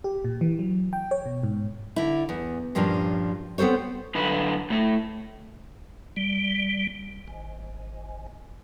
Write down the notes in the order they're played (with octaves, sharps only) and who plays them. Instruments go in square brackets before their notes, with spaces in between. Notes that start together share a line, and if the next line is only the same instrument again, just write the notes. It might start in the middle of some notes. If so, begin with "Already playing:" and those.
[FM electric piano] G4
A#2
E3
F#3
G5
C#5
B2
G#2
[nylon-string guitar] D3 E4
E2
G2 A#2 F3 A#3 C#4 D4
B3 C4 A4 C5 C#5
[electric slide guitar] F#2 D3 B4
A2 A3
[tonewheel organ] G3
G#1